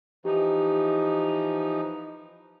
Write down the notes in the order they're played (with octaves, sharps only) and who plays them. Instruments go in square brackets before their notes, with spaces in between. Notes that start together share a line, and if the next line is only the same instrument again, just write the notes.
[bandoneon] E3 F3 D#4 [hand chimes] G4